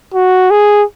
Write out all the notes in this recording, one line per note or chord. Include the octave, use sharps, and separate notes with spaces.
F#4
G#4